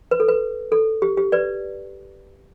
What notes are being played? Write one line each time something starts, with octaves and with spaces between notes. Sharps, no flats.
B4
A4
B4
A4
G4
G4
B4 D5